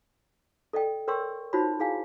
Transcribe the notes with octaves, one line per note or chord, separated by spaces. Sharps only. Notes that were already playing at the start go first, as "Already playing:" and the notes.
A4 D5 D#5 G5
A#4 C#5 G5 C6 C#6 E6
D#4 F4 F#4 C5 C#5 B5
E4 G#4 F5 G#5